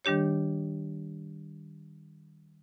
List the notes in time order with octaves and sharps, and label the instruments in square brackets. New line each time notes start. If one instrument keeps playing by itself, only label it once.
[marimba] D#3 G3 D4 G4 C#5